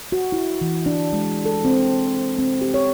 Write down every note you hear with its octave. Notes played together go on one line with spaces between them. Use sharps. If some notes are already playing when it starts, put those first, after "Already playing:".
F#4
E4
E3
D4
G#3
A4
C4
C4
G4
C#5